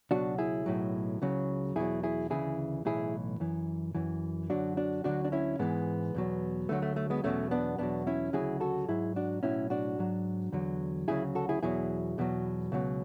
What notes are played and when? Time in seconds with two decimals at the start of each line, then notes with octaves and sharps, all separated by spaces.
0.11 C#2 B2 F#3 D4 F#4
0.38 E4 G#4
0.66 B1 A2 F#3
1.22 C#2 C#3 F#3
1.76 E2 B2 F#3 E4 G#4
2.03 E4 G#4
2.30 D2 C#3 E3 E4 G#4
2.85 B1 A2 E3 E4 G#4
3.40 F#2 E3
3.95 F#2 E3
4.50 F#2 D3 F#3 D4 F#4
4.77 D4 F#4
5.04 D2 D3 F#3 D4 F#4
5.24 D4
5.32 C#4 E4
5.59 G#2 E3 G#3 B3
6.15 E2 B2 F#3
6.69 D2 D3 F#3 A3
6.82 A3
6.96 A3
7.10 G#3 B3
7.24 E2 B2 F#3 A3 C#4
7.51 B3 D4
7.78 E2 B2 F#3 B3 D4
8.07 C#4 E4
8.33 D2 C#3 F#3 E4 G#4
8.61 F#4 A4
8.88 G#2 F#3 E4 G#4
9.16 D4 F#4
9.43 B1 A2 F#3 C#4 E4
9.70 D4 F#4
9.98 G#2 F#3
10.52 E2 D3 F#3
11.08 D2 C#3 F#3 E4 G#4
11.35 F#4 A4
11.49 E4 G#4
11.62 E2 B2 F#3 E4 G#4
12.18 E2 B2 F#3
12.72 C#2 B2 F#3